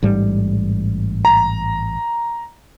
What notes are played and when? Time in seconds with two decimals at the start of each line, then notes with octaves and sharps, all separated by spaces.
0.03 A1 G#2 G3
1.25 A#5